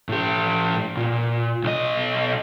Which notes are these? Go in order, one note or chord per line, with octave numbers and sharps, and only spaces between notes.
A2 G4
A#2
B1 D#5